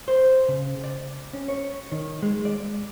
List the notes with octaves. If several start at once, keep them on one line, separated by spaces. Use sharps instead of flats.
C5
C#3
D5
C#4
C#5
D#3
G#3
D5